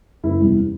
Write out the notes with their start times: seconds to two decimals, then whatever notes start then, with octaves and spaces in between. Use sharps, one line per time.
0.24 F#1 E4
0.40 E2 C3 E3 G3